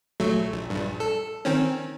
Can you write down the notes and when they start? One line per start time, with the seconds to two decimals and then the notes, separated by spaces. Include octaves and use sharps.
0.20 A#1 F#3 A3
0.53 A#1
0.70 A#1 G2
1.00 A4
1.45 D#3 C4 C#4